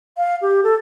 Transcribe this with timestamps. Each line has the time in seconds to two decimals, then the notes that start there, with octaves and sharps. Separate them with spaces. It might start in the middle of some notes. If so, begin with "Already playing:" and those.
0.17 F5
0.42 G4
0.64 A4